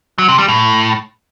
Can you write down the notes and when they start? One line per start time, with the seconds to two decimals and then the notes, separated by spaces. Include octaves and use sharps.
0.18 F#3
0.28 C3
0.38 G3
0.48 A2